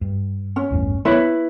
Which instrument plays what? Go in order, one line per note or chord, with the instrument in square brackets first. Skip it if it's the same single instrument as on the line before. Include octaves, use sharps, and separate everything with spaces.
[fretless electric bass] G2
[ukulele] C#4
[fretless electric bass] A1 E2 G2
[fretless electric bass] G3 B3 [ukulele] E4 B4 C#5